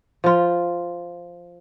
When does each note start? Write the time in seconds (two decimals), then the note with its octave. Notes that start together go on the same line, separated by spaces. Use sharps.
0.24 F3 F4